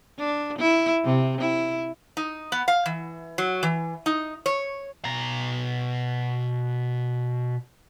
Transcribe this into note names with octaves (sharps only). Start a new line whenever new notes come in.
D4
E4
C3
E4
D#4
B3
F5
E3
F#3
E3
D#4
C#5
B2 A#5